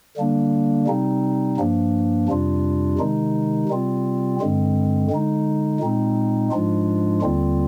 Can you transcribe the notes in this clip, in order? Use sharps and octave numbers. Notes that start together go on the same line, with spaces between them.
D3 G3 A#3 D4
C3 G3 C4 D#4
G2 F3 A#3 D4
F2 C3 G3 D4 F4
C3 D#3 G#3 D#4
C3 G3 C4 F4
G2 D3 G#3 C4
D3 G#3 D#4
A#2 G#3 C4 D#4
G#2 F3 G#3 D4 F4
D#2 D3 G3 C4 F4